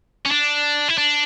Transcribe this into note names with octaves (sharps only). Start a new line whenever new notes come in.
C#4
D4
E4
D4